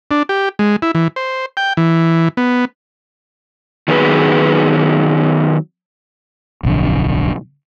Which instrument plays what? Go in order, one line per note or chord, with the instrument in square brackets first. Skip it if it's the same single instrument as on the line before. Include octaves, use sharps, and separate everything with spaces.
[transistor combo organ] D4
G4
G#3
E4
E3
C5
G5
E3
B3
[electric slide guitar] D#3 F#3 B3 G4 G#4 B4
[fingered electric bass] D1 B1 F2 D3